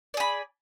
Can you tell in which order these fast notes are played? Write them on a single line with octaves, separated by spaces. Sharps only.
D5 G#4 B5